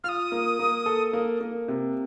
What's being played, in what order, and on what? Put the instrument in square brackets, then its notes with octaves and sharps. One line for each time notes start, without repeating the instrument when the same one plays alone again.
[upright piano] F4 [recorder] D#6 F6
[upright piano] A#3
A#3
A4
A#3
A#3
C3